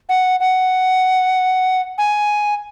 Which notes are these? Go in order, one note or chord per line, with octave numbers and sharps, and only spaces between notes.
F#5
F#5
G#5